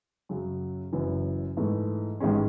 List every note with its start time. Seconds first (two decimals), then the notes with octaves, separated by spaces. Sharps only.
0.29 F#2 C#3 F#3
0.93 F#1 F#2 E3
1.57 G#2 E3 A3
2.20 A1 G#2 D#3 G#3 C#4